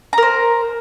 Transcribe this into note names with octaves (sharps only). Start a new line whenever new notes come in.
A#4 C5 A#5